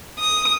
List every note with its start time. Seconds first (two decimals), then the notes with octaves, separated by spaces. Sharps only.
0.19 D#6